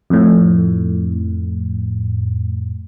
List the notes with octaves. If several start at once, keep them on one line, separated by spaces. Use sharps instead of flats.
F2 A2